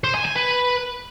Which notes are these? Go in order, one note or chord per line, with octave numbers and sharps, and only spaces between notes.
C5
G#5
G#5
B4